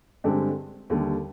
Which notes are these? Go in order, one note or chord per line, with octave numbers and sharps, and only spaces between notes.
G2 D3 G#3 C4 G4
D#2 D3 G3